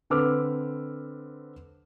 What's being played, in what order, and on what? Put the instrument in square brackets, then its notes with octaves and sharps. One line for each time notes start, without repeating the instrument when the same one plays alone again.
[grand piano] D3 C4 B4 D6 E6 F6